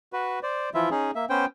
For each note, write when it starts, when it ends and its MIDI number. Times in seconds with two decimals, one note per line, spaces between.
0.13 0.39 66
0.13 0.39 71
0.43 0.70 72
0.43 0.70 74
0.74 0.89 52
0.74 0.89 53
0.74 0.89 64
0.74 0.89 65
0.74 0.89 76
0.91 1.11 61
0.91 1.11 63
0.91 1.11 68
1.15 1.25 58
1.15 1.25 76
1.30 1.46 59
1.30 1.46 61
1.30 1.46 72
1.30 1.46 79